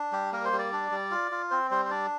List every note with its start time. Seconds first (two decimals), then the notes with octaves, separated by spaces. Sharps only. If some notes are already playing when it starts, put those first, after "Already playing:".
Already playing: D4
0.12 G3 G4
0.33 A#3 A#4
0.45 C5
0.52 G3
0.59 D5
0.73 D4
0.91 G3
1.11 F4
1.31 F4
1.51 C4 C5
1.71 G3 C5
1.85 C5
1.90 D4 D5